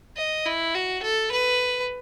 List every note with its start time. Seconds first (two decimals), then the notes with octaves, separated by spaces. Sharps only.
0.17 D#5
0.46 E4
0.75 F#4
1.02 A4
1.31 B4